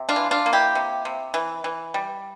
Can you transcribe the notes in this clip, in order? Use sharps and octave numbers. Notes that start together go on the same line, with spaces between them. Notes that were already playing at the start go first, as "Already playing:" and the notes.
Already playing: C3
D4 F4
E3
D4 F4
A#3
E4 G4
C3
C3
E3
E3
G3